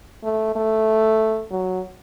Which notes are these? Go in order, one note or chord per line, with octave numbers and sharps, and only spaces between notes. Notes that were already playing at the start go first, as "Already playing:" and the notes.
A3
A3
F#3